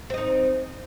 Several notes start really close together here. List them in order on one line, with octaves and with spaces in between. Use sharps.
C4 D#5 D#4